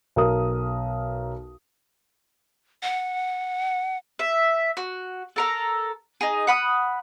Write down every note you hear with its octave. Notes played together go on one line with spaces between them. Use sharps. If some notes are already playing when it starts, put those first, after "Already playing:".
B1 A#4 D#6
F#5
E5
F#4
A4 A#4 A#5
D#4 G#4
F#5 B5 D#6